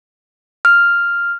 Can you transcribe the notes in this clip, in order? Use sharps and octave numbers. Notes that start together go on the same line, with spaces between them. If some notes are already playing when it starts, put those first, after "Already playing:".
F6